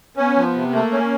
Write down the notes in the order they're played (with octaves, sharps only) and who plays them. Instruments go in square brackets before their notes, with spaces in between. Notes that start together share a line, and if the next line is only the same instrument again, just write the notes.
[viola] B3 [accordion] C#4
[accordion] F3
C3
[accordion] A3 [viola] A#3
[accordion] C#4